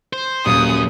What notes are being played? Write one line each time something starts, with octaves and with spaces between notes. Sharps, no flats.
C5
D#1 F#2 A#3 D#6